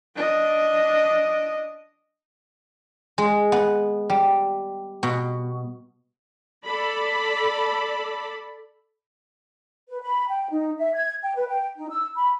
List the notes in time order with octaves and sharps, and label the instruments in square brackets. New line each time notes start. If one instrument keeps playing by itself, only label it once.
[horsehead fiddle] D4 D#5
[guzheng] G#3
B3
G3
B2
[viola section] A4 D5 B5
[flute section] B4
B5
G5
D#4
E5
G#6
G5
B4
G5
D#4
E6
B5